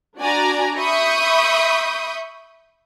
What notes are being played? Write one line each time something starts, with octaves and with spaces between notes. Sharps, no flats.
D4 F#4 D5 G#5 A#5
E5 B5 C#6 D#6 G6